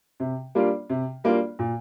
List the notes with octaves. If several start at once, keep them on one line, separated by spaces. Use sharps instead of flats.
C3
G3 A#3 D4 F4
C3
G3 A#3 D4 F4
A#2